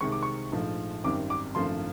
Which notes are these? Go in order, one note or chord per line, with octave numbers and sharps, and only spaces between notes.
C2 C3 D#3 G#3 C4 C#6
D6
C#6
A#1 G#2 F3 A3
G#1 F#2 D#3 G3 C4 D6
D6
G#1 F#2 D3 F3 A3 C6